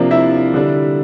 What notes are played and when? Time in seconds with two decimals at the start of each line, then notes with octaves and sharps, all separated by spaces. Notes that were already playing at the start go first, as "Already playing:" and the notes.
Already playing: C3 F3 A#3 D4 F4
0.11 E4 E5
0.54 D3 G3 D4